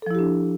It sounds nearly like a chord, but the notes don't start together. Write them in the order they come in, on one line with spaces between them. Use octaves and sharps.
A4 F3 E4 G4 D4